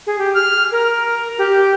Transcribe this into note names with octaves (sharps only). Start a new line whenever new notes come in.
G#4
G4
F6
A#4
G4